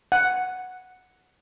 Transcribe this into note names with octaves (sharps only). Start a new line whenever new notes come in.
F#5